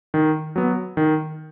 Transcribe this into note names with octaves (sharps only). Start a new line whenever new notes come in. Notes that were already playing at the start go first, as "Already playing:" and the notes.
D#3
F#3 B3
D#3